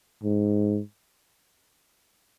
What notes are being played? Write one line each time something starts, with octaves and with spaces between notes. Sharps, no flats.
G#2